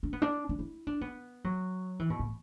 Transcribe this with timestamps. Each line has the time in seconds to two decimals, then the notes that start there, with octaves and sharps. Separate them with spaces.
0.03 D4
0.13 B3
0.22 D4
0.49 D4
0.59 E4
0.87 D4
1.01 B3
1.44 F#3
1.99 E3
2.10 B2
2.19 A2